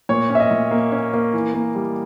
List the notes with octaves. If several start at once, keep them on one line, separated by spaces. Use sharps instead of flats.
A#2 C#5
C#4
E5
D#5
A#2
A#3
C#4
A#3
E3
A#3
G3